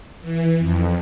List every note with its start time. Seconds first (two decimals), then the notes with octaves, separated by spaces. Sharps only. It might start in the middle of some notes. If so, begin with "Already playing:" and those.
0.21 E3
0.59 F2